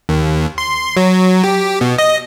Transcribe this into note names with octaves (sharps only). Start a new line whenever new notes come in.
D#2
C6
F#3
G4
B2
D#5